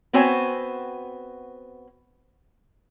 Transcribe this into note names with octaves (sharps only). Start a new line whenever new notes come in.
B3 C4 F#4 C5 C#5 G#5